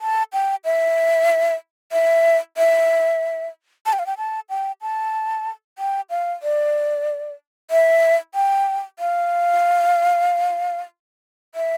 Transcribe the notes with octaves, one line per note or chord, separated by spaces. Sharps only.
A5
G5
E5
E5
E5
A5
G5
F5
G5
A5
G5
A5
G5
F5
D5
E5
G5
F5
E5